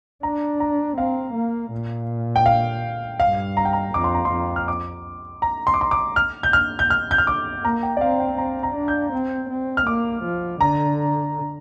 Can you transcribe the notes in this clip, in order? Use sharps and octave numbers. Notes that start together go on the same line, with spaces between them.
D4 A#5
A#5
C4 F5
A#3
A#2
G5
F5
G2 F5
A#5
G5
A#5
F2 D6
C6
A#5
C6
F2
F6
D6
A#5
C6
D6
C6
D6
F6
G6
F6
G6
F6
G6
F6
D6
A#3 A#5
G5
D5
C4 F5
G5
C4 A#5
A#5
D4
G6
C4
C4
F6
A#3 D6
F3
D3 A#5